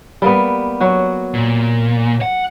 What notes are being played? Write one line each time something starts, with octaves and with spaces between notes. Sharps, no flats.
G3 A#3 B3
F#3 F#4
A#2
F#5